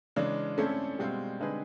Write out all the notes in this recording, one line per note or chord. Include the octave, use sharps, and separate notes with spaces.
C#3 E3 G#3 D4
A3 C4 C#4 E4 A4
B2 G3 G#3 C4 F4
D3 G#3 C4 D#4 G#4 B4